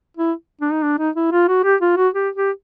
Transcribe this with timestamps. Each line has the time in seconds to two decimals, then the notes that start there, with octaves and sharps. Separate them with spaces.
0.17 E4
0.61 D4
0.72 D#4
0.82 D4
0.98 D#4
1.16 E4
1.32 F4
1.48 F#4
1.64 G4
1.81 F4
1.97 F#4
2.14 G4
2.35 G4